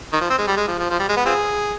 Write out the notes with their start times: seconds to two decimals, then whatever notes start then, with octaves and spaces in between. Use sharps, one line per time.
0.13 D#3
0.21 F3
0.30 C4
0.38 G#3
0.47 G3
0.57 G#3
0.68 F3
0.79 F3
0.90 F3
0.99 G3
1.09 G#3
1.17 B3
1.25 C4 F4 G#4